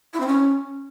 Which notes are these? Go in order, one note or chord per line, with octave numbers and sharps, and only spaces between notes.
E4
C4
C#4